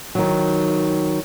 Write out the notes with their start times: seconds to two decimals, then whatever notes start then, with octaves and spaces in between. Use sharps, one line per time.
0.15 D#3 F#3